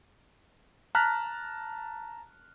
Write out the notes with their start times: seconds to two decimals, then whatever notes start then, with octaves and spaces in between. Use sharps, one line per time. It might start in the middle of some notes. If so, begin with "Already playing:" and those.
0.95 A5 A#5 F6 F#6 B6